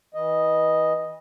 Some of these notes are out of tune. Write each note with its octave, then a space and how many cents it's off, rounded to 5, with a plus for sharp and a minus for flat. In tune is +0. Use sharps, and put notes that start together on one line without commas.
E3 -30 D#5 +0